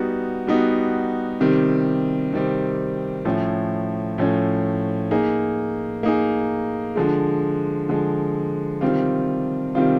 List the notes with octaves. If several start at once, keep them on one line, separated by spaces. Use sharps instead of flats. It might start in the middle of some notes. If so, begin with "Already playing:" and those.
Already playing: G3 B3 D#4 F#4
G3 B3 D#4 F#4
C3 D#3 G3 C4
C3 D#3 G3 C4
A2 F3 A3 C#4
A2 F3 A3 C#4
A#3 D#4 G#4
A#3 D#4 G#4
D3 F3 G#3
D3 F3 G#3
C3 D#3 G3 C4 F4
C3 D#3 G3 C4 F4